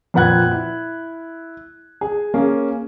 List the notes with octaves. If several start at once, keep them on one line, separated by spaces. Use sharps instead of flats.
F2 A#2 B4 F#5 F#6 G#6
E4
G#4
A#3 C#4 G#4